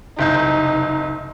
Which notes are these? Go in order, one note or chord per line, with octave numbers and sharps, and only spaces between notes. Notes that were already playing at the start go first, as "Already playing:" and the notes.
F#1 C2 D#4 G6